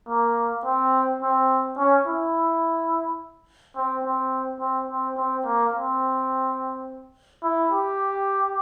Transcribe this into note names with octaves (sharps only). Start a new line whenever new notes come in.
A#3
C4
C4
C#4
E4
C4
C4
C4
C4
C4
A#3
C4
E4
G4